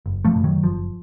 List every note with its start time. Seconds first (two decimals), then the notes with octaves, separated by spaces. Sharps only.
0.06 F#1
0.25 F3 A3
0.35 F#2 C#3
0.44 D#3 F#3
0.63 F#1 F3